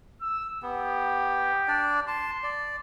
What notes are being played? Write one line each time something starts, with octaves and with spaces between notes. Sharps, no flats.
E6
B3 G4
D4 D5
A5 C6
D5